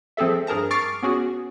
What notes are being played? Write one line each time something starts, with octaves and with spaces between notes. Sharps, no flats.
F3 C4 G#4 A4 E5
G2 G#4 A#4 A5 A#5
C#6 D6 F6 A6 C7 D7
B3 C#4 F#4 G#4